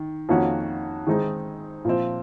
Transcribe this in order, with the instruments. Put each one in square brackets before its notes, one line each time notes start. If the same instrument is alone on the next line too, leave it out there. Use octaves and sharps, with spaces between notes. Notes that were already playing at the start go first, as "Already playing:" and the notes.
Already playing: [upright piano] D#3
F2 D#3 A#3 C#4 F#4
D#3 G#3 C4 D#4 G#4
A#2 F3 C4